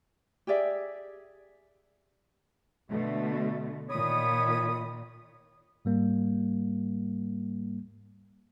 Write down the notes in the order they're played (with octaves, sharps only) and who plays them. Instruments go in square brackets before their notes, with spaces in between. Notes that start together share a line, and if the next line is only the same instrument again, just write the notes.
[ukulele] G4 G#4 D5 E5
[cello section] B2 D3 A3
[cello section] A#2 D#3 [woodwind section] C#5 B5 D#6
[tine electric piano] G#2 G3 A#3